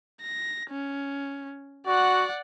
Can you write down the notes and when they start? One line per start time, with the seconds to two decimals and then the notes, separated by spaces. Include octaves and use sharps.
0.22 A#6
0.71 C#4
1.87 F#4 D5 F#5